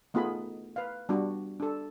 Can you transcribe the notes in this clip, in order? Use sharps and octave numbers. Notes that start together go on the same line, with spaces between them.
A3 B3 D#4 F4 G#4 B5
B4 F5
G3 B3 D4 F#4
D4 A4